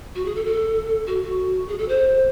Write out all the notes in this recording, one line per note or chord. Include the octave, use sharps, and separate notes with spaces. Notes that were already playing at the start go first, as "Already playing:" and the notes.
F#4
G#4
A4
A4
F#4
F#4
G#4
A4
C5